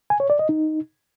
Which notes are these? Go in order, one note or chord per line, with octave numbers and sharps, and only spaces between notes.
G#5
C#5
D5
D#5
D#4